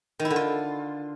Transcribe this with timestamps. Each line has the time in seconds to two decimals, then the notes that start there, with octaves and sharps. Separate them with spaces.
0.19 D#3
0.25 E4
0.30 D3
0.36 F4